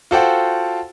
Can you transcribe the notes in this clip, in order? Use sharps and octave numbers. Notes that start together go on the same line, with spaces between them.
F4 F#4 A4 C5 F#5 G5